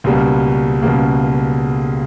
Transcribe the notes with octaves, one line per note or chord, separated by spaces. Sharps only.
C#2 B2 G3 A#3
C#2 B2 G3 A#3